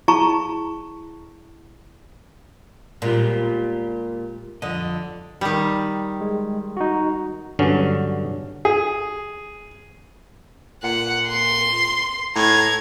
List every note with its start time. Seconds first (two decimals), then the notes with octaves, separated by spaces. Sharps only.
0.08 E4 G#4 A5 A#5 C#6
3.02 A#2 G#3 F4 G4
4.62 F2 D3 D#5
5.41 D#3 G3
6.21 G#3
6.77 D#4 F#4
7.59 G2 D3 F#3 C#4
8.65 G#4
10.83 A#2 F#5
11.27 C6
12.36 A2 A#5 G#6